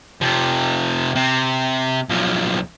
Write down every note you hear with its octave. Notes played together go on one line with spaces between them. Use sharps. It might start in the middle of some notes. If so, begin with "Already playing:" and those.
C3 F3
C3
B1 F3